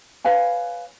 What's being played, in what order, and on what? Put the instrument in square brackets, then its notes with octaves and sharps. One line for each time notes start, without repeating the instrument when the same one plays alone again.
[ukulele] B4 C#5 F5 G#5